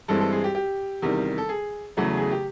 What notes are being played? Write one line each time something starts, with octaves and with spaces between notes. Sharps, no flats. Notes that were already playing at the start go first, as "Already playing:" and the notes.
G2 E3 G#3 C4 A4
A4
G#4
G4
G4
E2 C3 D#3 G3
A4
G#4
E2 C#3 F#3 A3
G#4
G4